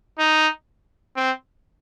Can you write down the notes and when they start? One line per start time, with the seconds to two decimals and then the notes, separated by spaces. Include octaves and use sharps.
0.19 D#4
1.16 C4